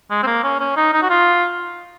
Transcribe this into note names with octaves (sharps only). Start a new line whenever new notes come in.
G#3
C4
A#3
C#4
C#4
D#4
D#4
F#4
F4